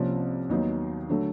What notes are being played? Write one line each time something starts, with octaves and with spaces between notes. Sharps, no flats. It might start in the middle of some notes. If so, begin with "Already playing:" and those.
Already playing: C2 C3 F3 A#3 C#4
D#2 D#3 F#3 B3 D#4
D3 F#3 A3